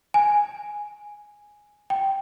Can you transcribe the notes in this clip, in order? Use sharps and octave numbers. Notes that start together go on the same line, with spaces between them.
G#5
G5